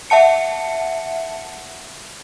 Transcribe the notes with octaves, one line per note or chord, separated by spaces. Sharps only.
E5 F#5 A5 C#7